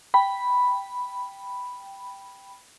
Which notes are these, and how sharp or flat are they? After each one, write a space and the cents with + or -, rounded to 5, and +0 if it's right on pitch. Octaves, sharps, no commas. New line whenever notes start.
G5 +0 B5 +0